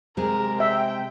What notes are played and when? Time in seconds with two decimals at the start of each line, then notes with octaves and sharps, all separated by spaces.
0.17 C3 G#3 A#4
0.60 E5 G5